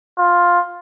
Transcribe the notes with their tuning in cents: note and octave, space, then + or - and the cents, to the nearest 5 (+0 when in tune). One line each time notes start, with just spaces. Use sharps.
F4 +10